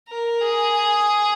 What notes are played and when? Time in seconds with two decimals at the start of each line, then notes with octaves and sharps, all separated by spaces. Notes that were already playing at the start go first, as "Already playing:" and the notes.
0.08 A#4
0.41 G#4